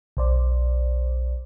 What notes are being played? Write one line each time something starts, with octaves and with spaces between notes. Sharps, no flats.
B1 C5 D5